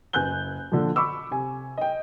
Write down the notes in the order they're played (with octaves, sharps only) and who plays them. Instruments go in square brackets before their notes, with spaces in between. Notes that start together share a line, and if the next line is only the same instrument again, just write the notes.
[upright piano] F#1 B4 G#5 F#6 G6 G7
A#2 D3 F3
B5 C#6 D6 E6
C3 G#5
D#5 G5